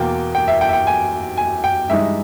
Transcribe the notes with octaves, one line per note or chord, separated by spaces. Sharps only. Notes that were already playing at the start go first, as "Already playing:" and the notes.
Already playing: E2 B2 A#3 G5
G5
E5
G5
E5
G5
G#5
G#5
G5
G2 E3 G#3 D#4 E5